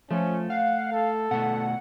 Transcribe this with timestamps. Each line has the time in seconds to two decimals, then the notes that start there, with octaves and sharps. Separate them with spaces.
0.11 F3 A3 C#4
0.50 F5 F#5
0.92 A4
1.31 B2 A3 F#5